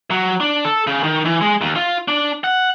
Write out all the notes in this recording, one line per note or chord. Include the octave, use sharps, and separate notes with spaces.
F#3
D4
A4
C#3
D#3
E3
G#3
D#2
F4
D4
F#5